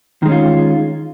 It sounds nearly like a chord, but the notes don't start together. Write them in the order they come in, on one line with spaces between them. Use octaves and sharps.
D#3 G#3 C#4 F4